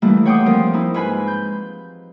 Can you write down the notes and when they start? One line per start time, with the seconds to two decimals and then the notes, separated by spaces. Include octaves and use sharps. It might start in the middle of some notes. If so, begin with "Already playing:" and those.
0.02 D#3 E3 G3 A3 A#3 E4
0.25 C#5 F#5 G5 C6 D6 D#6
0.46 F3 A#3 C4 A#4 C5
0.74 D#4 E4
0.94 G#2 F4 B4 G#5 B5
1.28 G6